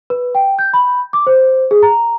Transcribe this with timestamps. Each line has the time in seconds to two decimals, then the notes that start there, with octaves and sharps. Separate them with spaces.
0.10 B4
0.35 G5
0.59 G6
0.74 B5
1.13 D6
1.27 C5
1.71 G#4
1.83 A#5